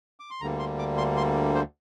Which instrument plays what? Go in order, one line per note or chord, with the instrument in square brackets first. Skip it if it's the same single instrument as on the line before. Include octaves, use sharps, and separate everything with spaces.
[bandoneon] D6
C6
D2 D3 G3 A#3 A#5
C6
D6
C6
C6
C5